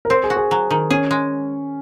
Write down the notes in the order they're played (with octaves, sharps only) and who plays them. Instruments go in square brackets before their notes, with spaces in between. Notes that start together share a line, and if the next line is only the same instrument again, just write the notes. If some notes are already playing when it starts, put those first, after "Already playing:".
[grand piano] A#4
[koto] C4 [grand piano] C5
[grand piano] G#4
[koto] F#4
[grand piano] G#4
[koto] F#3
D#3
[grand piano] C#4 [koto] G#4
[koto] G#3